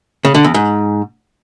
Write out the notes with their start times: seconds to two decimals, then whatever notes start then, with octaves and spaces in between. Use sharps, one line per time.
0.25 C#3
0.35 D3
0.44 E2
0.54 G#2